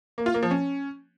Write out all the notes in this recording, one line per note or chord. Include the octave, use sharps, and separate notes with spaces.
A#3
F4
A#3
F3
C#4